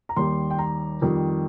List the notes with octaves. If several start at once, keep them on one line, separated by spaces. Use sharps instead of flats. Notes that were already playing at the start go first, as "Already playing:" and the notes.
A#5
D#2 D#3 G3 C6
G5
A#5
F2 D#3 G3